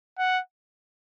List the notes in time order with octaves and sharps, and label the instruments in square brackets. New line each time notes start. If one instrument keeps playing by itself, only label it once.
[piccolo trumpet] F#5